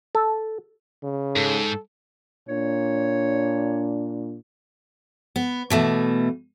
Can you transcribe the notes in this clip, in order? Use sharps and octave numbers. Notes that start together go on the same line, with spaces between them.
A4
C#3
G#2 A4
A#2 D4 C#5
B3
B2 E3 A3